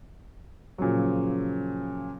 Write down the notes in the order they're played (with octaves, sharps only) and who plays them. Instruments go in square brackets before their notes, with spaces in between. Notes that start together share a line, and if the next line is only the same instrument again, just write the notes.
[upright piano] A#2 C#3 F3 F#3